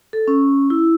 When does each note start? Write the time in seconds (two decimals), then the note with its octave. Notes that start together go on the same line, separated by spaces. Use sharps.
0.13 A4
0.28 C#4
0.70 E4